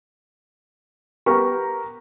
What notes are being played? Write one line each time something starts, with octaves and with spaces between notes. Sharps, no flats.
B3 G4 A#4 A#5 C#6